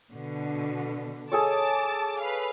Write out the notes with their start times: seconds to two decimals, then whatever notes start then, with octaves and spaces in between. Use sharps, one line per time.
0.12 B2 D3
1.32 G#4 A4 C#5 A5 D6
2.20 B4 F5